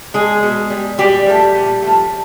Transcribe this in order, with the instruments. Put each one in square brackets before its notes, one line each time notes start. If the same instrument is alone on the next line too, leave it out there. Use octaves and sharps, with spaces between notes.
[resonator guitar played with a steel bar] G3 G#3 G#4
B2
G3
A#2 G3 G4
F3 A3
A#2
F3 A3